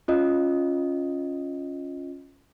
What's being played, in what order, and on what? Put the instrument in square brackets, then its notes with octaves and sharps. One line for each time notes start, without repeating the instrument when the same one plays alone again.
[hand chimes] C#4 F4 D#5